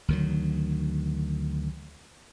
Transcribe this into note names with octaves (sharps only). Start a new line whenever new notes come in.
D2 D#3 F#3